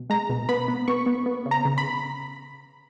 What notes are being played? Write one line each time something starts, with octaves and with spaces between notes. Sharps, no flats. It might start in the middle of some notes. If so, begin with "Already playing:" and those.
Already playing: B2
G#3 A#5
B2
B3 B5
B3
B3 C#6
B3
B3
C#3
A#5
C#3
B5